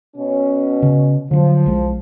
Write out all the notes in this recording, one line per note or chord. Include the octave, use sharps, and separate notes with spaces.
B2 C#4
C#3
D3 F3 F#3
B1 G#3